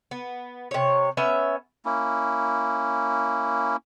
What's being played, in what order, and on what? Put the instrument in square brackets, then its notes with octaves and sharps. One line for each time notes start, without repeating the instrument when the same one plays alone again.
[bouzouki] B3
C3 C#5
B3 C#4 E5
[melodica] A#3 C#4 E4